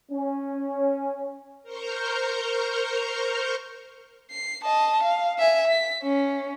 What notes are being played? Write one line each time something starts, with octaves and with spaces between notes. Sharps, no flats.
C#4
A#4 C5 A#5 C#6 F6 G6
C7
D#5 A5
F5
E5 G#5
B6
C#4